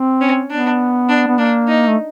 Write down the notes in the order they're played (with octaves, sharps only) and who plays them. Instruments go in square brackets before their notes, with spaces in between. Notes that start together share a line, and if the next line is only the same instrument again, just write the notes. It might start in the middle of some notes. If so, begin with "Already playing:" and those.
Already playing: [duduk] C4
[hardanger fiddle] C#4
[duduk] B3 [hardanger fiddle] D4
[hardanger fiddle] D4
[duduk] B3
[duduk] A#3 [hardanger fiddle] D4
[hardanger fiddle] D#4
[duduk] A3